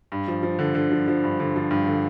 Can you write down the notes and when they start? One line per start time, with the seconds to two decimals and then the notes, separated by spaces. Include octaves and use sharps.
0.12 G2
0.28 F3
0.43 F3
0.59 D3
0.75 D3
0.91 F3
1.08 F3
1.24 G2
1.40 D3
1.56 F3
1.71 G2
1.87 D3